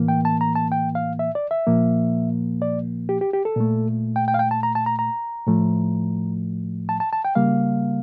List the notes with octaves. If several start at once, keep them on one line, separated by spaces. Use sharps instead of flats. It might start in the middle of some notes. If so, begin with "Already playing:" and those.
Already playing: A2 E3 A#3
G5
A5
A#5
A5
G5
F5
E5
D5
E5
A#2 F3 A#3
D5
G4
G4
G4
A4
A#2 A3
G5
G5
F5
G5
A5
A#5
A5
A#5
A#5
A2 F3 A3
A5
A5
A5
G5
C#3 G3 A#3 F5